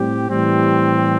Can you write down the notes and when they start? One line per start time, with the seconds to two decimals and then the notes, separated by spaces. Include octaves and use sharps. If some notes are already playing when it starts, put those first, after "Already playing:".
Already playing: A2 G3 C4 G4
0.29 A2 E3 G3 C4